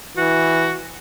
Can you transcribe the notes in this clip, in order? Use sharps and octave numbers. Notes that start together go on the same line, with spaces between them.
E3 F#4